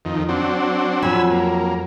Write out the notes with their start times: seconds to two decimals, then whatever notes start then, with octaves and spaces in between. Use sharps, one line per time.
0.05 F2 D#3
0.29 F#3 C4 D4
1.03 F2 F#3 G#5 B5 E6
1.31 A#3